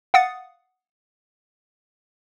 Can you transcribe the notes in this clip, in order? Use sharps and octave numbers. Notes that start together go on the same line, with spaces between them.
F5 F#5 D#6 A6 C#7